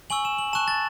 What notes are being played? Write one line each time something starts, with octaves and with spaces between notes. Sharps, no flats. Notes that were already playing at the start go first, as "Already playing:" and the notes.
G#5 C#6 E6 F#7
E7
F#7
A5 C#6 F#6 E7
A6